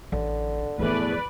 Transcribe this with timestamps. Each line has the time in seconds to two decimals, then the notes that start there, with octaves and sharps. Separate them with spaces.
0.12 A1 D3
0.79 E2 A2 E3 F3 A3 B4 D5